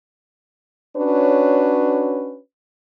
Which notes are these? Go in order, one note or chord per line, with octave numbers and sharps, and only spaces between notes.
C#4 D4 F#4 B4 C#5